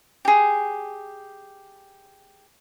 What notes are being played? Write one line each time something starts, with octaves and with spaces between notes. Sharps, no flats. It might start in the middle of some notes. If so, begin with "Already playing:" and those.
G4 G#4